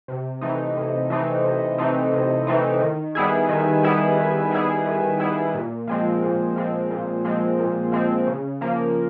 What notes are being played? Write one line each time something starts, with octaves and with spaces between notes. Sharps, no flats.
C3
E3 A3 C4 D#4
C3
E3 A3 C4 D#4
C3
E3 A3 C4 D#4
C3
E3 A3 C4 D#4
D#3
G3 B3 E4 G#4
D#3
G3 B3 E4 G#4
D#3
G3 B3 E4 G#4
D#3
G3 B3 E4 G#4
A#2
F3 G#3 C4
A#2
F3 G#3 C4
A#2
F3 G#3 C4
A#2
F3 G#3 C4
C#3
F3 A#3